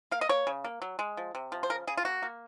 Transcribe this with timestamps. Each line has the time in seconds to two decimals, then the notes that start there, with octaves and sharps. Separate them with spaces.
0.11 A#3 F5
0.21 D#5
0.29 A#3 C#5
0.47 C#3
0.64 A#3
0.82 F#3
0.99 G#3
1.17 F3
1.35 C3
1.52 F3
1.63 C5
1.70 C#3 A#4
1.87 C#3 G#4
1.97 F4
2.05 A#3 F#4
2.22 A#3